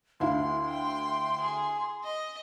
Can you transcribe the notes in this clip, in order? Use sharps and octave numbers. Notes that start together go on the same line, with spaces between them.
D2 E4 F5 C6
G5
G#4
D#5